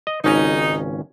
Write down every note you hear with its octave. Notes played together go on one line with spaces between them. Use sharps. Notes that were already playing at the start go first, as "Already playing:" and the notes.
D#5
G#1 C#2 C#4 D#4